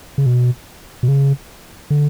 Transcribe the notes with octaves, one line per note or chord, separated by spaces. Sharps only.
C#3
B2
B2
C#3
D3